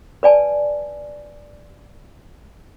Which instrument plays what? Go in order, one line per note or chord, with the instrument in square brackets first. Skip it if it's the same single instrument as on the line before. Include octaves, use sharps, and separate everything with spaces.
[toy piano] B4 D5 G#5 A5